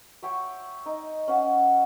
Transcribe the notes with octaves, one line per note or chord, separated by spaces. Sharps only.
C#5 E5 G5 C#6
D#4
C#4 F5 F#5